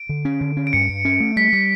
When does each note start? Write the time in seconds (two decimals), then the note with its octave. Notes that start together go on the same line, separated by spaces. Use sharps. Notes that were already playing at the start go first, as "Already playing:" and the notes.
Already playing: D7
0.09 D3
0.25 C#4
0.41 D3
0.57 C#4
0.67 D7
0.73 G2 C#7
0.89 G2
1.05 C#4
1.20 A3
1.36 G3 B6
1.53 G3